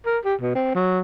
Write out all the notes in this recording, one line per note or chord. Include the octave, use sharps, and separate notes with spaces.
A#4
G4
B2
C4
F#3